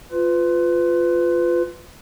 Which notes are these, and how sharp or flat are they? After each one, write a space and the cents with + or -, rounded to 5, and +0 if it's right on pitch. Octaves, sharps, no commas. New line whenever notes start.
F4 +0 B4 +25